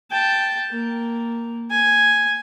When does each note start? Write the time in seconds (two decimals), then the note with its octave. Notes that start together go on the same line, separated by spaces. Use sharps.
0.11 G5 A5
0.71 A#3
1.71 G#5